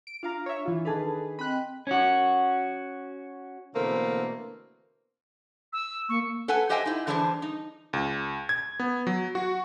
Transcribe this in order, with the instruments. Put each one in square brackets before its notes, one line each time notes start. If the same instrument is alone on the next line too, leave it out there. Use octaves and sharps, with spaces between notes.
[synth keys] D7
[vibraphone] D4 [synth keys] F4 F5 A#5
[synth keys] C#5 E5
E3 F4
[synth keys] D#3 G#4 B4 [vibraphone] D4 A4 A5
[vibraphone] C4 D#5 G5 [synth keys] B5 F#6
[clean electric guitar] C#4 F#4
[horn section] B2 D3 E3 A3 A#3 C4
[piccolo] E6
[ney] A#3 [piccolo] C#6
[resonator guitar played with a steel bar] A4 B4 F#5 G#5
G4 C5 D#5 E5 G5 G#5
D#4 E4
D3 E3 G3 D4 G#4 C5
D#4
[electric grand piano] C#2
G#6
B3
F#3
F#4